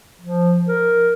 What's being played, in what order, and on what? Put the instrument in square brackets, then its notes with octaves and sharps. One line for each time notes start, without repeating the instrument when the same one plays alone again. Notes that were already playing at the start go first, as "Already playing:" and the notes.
[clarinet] F3
A#4